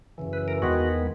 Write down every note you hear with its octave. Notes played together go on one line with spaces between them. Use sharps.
F#2 C#3 E3
B4
A#4
E2 D#3 G#3 B3 F#4